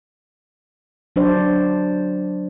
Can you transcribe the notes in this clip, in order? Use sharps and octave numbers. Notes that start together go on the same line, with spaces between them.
F#3 D4 C5 D5